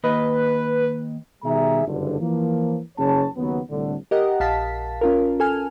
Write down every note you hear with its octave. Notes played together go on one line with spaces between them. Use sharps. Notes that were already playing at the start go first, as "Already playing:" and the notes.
D#3 A#3 B4 D#5
B2 D#3 G3 G#4 E5 A#5
F#1 G2 D3
E3 F3 A#3
F#1 C#3 C#5 A5
D#2 C#3 F#3 B3
C2 A2 D3
G4 A#4 D#5 F#5
A#1 F5 A5 B6
C#4 F4 A#4
A4 G#5 F6